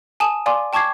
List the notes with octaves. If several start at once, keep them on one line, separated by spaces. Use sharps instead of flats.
G#5 A5 D#6 E7
D5 F5 G#5 C6 D6
G5 A5 C#6 D6 G#6 C7